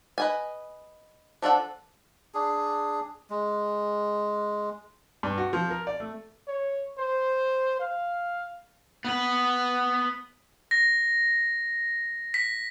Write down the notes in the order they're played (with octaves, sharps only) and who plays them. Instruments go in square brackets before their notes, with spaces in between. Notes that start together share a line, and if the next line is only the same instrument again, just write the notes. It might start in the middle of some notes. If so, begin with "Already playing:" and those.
[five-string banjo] B4 D#5 G#5
F3 D4 A4 F#5
[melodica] D4 G#4
G#3
[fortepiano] G2
F#4
F3
A#4
D5
A3
[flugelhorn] C#5
C5
F5
[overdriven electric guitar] B3 B4
[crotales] A#6
B6